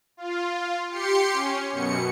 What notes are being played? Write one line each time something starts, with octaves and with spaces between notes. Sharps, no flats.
F4
G4 C6 C#7
C#4
F#2 B2 C#7